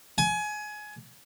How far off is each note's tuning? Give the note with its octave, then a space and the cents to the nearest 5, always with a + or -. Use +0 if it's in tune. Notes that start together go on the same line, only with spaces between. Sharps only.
G#5 +25